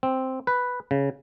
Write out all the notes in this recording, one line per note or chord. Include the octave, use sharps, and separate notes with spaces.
C4
B4
C#3